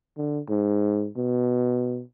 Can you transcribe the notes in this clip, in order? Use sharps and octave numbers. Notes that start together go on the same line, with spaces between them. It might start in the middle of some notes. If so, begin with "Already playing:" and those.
D3
G#2
B2